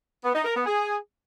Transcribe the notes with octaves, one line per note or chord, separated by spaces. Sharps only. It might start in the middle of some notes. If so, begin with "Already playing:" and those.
B3
D#4
A#4
B3
G#4